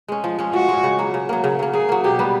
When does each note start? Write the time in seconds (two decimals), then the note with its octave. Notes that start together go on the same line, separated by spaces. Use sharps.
0.08 G#3 C#4
0.24 F3
0.39 G#3 C#4
0.53 F3 F#4
0.69 G#3 C#4
0.83 C#3
0.99 F#3 A#3
1.14 C#3
1.29 F#3 A#3
1.44 C#3
1.59 F#3 A#3
1.73 C#3 G#4
1.89 F#3 A#3
2.04 B2 G4
2.19 G3 B3